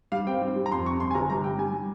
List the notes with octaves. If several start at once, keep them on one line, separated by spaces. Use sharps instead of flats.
G3 F5
C4 G5
G3
G3
A#5
F2 C6
C3 C#6
C3 C6
G#5
G1 A#5
G3 A#5
G3 G5
G3 G#5
G3